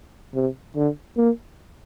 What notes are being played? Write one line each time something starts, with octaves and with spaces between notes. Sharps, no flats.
C3
D3
A#3